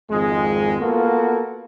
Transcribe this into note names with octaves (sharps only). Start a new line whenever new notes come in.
G#1 F2 G#3
A#3 B3 F4 F#4 A4